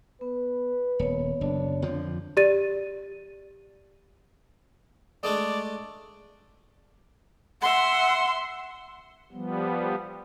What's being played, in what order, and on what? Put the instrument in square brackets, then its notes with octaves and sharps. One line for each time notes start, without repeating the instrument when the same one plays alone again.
[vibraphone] B3 [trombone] B4
[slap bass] D#1 [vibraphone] B3 C#5
[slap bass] F#1 [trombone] D4
[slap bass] F2 D3 F3
[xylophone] G4 D5 A6 D#7
[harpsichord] G#3 A3 D4 [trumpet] D5
[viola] E5 C6 [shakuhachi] F#5
[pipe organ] F3 G3 B3